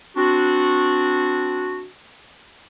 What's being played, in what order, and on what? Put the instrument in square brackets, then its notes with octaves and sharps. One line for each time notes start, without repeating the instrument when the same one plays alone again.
[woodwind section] C4 D4 F#4